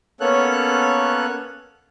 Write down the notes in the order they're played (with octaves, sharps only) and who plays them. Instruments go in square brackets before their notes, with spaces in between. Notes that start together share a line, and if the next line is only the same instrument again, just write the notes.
[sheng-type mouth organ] A#3 B3 C#4 A4 C#5 F#6